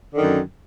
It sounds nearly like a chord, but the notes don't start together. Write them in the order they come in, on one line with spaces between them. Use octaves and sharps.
D3 D#3 F#2